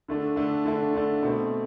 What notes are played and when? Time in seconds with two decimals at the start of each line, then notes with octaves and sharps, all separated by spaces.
0.08 D3 A3 D4
0.36 D3 A3 D4
0.65 D3 A3 D4
0.94 D3 A3 D4
1.23 B2 A3 C4